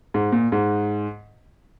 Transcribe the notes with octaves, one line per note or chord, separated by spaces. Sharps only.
G#2
A#2
G#2